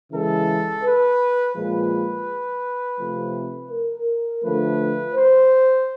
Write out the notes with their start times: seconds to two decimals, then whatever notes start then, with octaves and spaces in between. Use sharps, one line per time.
0.11 C#3 E3 G#3 A4
0.84 B4
1.55 A#2 F3 G#3 B4
2.99 C3 F3 A3
3.71 A#4
4.43 D3 F3 A3 B4
5.15 C5